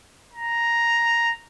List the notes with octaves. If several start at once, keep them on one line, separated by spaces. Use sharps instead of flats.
A#5